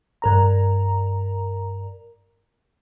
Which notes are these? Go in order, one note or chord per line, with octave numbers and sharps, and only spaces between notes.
G2 A#4 A#5